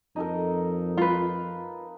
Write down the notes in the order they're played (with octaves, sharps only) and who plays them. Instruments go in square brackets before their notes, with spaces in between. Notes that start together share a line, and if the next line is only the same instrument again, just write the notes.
[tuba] F2 [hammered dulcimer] D#4 A4 A#4
[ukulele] F4 B4